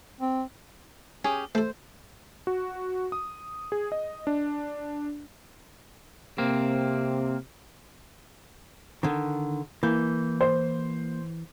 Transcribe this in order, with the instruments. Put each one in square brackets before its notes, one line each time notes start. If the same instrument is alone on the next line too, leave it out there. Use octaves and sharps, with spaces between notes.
[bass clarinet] C4
[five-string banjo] C#4 G4 G#4
[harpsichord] A3 A4 [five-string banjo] C5
[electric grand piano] F#4
D#6
G#4
D#5
D4
[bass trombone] C3 [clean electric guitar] A#3 C4
[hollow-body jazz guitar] D3 D#3
[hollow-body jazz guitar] E3 [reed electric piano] A#3 G6
[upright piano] C5